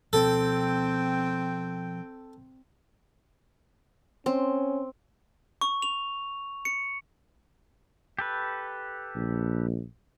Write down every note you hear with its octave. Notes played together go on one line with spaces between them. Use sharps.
B2 F3 C4 A4 G5
C4 C#4
C#6
F7
C#7
G4 A4 B4
A#1